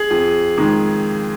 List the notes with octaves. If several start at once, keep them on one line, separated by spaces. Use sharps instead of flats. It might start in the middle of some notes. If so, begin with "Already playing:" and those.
Already playing: G#4
F2
D#3 G#3